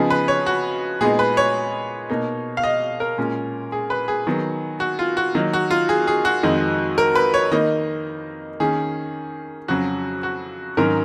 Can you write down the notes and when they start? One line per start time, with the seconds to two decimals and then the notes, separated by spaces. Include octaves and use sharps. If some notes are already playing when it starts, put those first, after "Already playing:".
Already playing: C#3 F3 B3 D#4 G#4
0.10 B4
0.28 C#5
0.46 F#4
1.01 A#2 G#3 B3 D#4 G#4
1.19 B4
1.37 C#5
2.10 B2 A#3 D#4
2.57 F5
2.64 D#5
3.00 A#4
3.18 A#2 G#3 C#4
3.72 G#4
3.90 B4
4.08 G#4
4.27 D#3 F#3 B3
4.80 F#4
4.99 F4
5.17 F#4
5.35 D#3 F#3 A#3 D#4
5.53 F#4
5.71 F4
5.89 G#4
6.07 G#4
6.25 F#4
6.43 F2 D#3 G#3 D#4
6.98 A#4
7.15 B4
7.34 C#5
7.52 D#3 A#3 D#4 D#5
8.60 D#3 A#3 C#4 G#4
9.68 F2 C#3 F#3 C#4 F#4
10.23 F#4
10.77 G#2 D#3 F#3 C#4 A#4